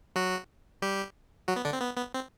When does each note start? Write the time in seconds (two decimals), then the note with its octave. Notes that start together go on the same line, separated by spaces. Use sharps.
0.16 F#3 F#4
0.82 G3 G4
1.48 F#3 F#4
1.56 B3
1.65 D3 D4
1.73 C4
1.81 B3
1.97 B3
2.14 C4